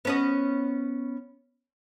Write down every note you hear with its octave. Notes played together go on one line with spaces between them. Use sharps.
B3 C#4 D#5